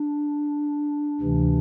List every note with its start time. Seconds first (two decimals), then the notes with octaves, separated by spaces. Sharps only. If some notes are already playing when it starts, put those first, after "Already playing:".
Already playing: D4
1.20 D2 C3 E3